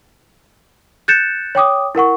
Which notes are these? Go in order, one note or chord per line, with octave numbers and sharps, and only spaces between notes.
F#6 G6 A6 C#7 E7
C#5 G5 D6 D#6
E4 A#4 F#5 C#6